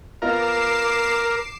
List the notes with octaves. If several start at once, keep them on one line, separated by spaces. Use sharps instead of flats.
B3 F4 A#4 D#5 D6 C7 E7